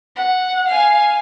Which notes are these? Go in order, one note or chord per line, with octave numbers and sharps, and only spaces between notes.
F#5
F5 G#5